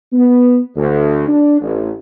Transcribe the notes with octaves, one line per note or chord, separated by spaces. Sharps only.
B3
D2
D4
A1